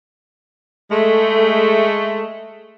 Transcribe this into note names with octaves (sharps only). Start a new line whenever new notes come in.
G#3 A3